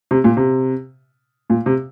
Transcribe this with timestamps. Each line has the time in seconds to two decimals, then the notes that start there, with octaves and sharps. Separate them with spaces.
0.11 C3
0.24 A#2
0.37 C3
1.50 A#2
1.66 C3